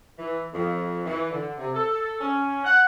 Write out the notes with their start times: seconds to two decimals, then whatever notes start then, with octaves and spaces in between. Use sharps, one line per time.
0.18 E3
0.53 F2
1.06 E3
1.31 D3
1.58 C3
1.74 A4
2.21 C#4
2.65 F#5